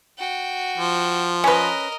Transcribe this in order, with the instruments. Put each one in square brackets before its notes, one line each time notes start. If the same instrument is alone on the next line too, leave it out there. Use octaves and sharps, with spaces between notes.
[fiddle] F#4 G5
[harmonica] F3
[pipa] C#4 B4 [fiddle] A#4 D#5